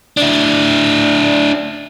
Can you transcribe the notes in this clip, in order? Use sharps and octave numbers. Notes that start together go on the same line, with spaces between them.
D4 E4